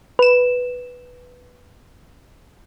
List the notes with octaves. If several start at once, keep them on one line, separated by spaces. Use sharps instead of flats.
B4 E7